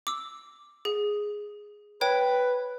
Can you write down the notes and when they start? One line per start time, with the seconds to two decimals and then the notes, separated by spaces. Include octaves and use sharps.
0.07 D6 E6
0.85 G#4
2.01 B4 C#5 G5